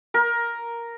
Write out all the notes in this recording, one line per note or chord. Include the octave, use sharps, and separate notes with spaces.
A#4